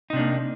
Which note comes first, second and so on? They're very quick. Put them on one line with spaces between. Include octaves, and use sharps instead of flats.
D#4 C3 D4 A#3